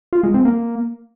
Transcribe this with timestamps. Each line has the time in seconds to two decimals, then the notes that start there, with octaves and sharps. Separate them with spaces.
0.13 F4
0.23 G#3
0.34 C4
0.45 A#3